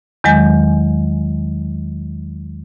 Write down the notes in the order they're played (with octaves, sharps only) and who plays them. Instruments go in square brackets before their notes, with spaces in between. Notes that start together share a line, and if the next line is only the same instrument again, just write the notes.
[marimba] E2 D#3 F#3 G#3 G#5 G6